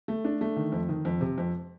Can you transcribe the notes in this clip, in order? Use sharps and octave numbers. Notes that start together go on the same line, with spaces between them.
A3
D4
A3
D#3
F2
D#3
F2
C3
F2